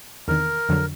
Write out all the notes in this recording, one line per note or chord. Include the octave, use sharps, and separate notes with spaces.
E2 C3 D#3 A#4
F2 D3 F#3